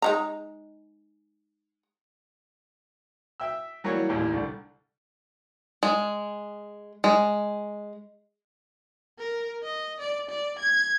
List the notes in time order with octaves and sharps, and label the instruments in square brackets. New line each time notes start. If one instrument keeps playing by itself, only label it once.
[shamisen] G#3 D#4 A#5
[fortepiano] E5 G5 E6
E3 F#3 G3 A#3 C#5
A1 D#2 A#2 E3 G4
C2 D3 G3
[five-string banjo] G#3
G#3
[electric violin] A#4
D#5
D5
D5
G#6